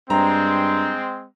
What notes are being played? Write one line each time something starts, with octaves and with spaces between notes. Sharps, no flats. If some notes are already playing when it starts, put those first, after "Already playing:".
G2 G#3 C4 A#5